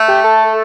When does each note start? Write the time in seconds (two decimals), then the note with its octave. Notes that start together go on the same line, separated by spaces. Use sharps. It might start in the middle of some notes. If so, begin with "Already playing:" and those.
Already playing: A3
0.08 G4
0.24 A4